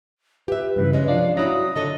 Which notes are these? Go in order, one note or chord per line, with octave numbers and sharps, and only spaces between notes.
F4 G4 B4 E5
G2 C#3 E3 B4
G#3 C#4 D#5
C3 F3 D4 F5
F#3 C#4 E4 F#4 D#6 A#6
D3 A4 C#5 D#5